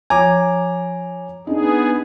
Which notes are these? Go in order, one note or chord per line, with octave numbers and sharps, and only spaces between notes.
F3 C#5 G#5 A#5 D6
B3 D4 D#4 G#4